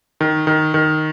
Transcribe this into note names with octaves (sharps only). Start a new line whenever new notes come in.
D#3
D#3
D#3